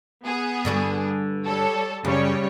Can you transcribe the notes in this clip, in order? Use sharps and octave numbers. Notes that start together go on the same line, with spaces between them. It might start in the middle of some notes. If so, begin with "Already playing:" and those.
B3 G#4
G2 D3 F#4
G3 A4 C#5
F#2 C#3 G3 C#5